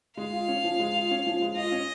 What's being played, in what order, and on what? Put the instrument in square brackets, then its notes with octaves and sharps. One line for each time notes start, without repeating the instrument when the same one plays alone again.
[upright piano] G#3 [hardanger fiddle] F5
[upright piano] F4
C#4
F3
G#3
F4
C#4
F3
G#3
[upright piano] F4 [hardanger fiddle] D#5
[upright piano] C#4